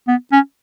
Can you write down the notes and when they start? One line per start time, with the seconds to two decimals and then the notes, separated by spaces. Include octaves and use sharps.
0.08 B3
0.32 C#4